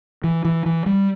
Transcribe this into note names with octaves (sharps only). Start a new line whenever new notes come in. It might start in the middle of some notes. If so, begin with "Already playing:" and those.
E3
E3
E3
G3